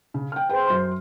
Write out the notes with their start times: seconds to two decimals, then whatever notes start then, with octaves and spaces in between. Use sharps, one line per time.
0.14 C#3
0.32 G5 F6
0.49 G#4 B4 C5 G5
0.67 F#2 C6